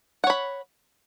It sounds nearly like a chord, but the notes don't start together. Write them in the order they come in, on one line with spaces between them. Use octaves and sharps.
F#5 C#5 B5